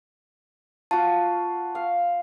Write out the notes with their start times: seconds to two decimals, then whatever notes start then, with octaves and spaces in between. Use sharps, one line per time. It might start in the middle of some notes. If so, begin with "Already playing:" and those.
0.91 F4 F#4 A5
1.75 F5